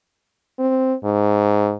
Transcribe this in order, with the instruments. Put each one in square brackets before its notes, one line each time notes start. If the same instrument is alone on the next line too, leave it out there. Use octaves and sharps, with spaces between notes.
[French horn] C4
G#2